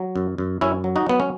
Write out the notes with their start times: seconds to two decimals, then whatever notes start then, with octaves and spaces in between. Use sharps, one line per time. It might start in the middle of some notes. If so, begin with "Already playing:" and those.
Already playing: F#3
0.16 F#2
0.38 F#2
0.61 F#2 C#4 E4
0.84 F#3
0.96 D#4 F#4
1.06 F#3 B3
1.20 C#4